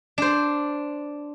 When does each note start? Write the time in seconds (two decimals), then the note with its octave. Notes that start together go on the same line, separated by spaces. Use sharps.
0.18 D4 C5